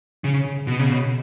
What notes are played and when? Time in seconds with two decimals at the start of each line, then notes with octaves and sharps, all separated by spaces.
0.24 C#3
0.67 B2
0.79 C#3
0.92 B2